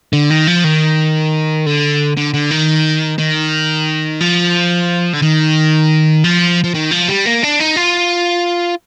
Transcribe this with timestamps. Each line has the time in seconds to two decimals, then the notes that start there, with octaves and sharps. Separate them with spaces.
0.13 D3
0.30 D#3
0.47 F3
0.64 D#3
1.66 D3
2.17 D3
2.34 D3
2.51 D#3
3.19 D#3
4.20 F3
5.13 D3
5.22 D#3
6.24 F3
6.64 F3
6.75 D#3
6.92 F3
7.09 G3
7.26 A#3
7.43 D4
7.60 D#4
7.76 F4